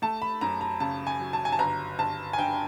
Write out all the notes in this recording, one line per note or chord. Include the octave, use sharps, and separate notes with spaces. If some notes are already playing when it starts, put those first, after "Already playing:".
A3 A5
B5
F#2 A#5
A#5
C#3 A5
G#5
F#3
A5
G#5
A5
G1 A#5
G1 A5
G#5
G2 G5